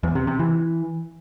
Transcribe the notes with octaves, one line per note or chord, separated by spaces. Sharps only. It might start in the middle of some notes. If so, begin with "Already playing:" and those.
E2
C3
C3
E3